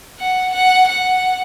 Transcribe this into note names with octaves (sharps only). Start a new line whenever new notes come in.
F#5
F#5
F#5